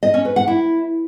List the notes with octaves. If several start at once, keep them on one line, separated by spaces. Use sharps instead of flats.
D#5
C#4
B4
F#5
E4